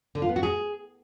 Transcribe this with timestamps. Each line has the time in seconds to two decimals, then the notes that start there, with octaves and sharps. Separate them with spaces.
0.15 D3
0.22 F4
0.29 B3
0.36 F#4
0.43 G#4